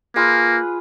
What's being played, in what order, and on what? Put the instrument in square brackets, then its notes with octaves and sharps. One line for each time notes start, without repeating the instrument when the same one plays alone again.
[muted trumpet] A#3 [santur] F4 G#4 B4